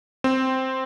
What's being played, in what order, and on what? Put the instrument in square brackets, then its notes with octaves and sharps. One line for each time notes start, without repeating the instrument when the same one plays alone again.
[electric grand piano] C4